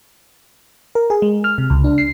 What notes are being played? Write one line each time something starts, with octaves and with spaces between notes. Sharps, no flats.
A#4
G#4
G#3
F6
C3
C#2
D4
C7